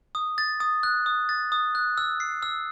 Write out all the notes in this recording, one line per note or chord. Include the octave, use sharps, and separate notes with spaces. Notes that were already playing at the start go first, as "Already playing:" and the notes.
D#6
A6
D#6
F#6
D#6
A6
D#6
F#6
E6
C7
E6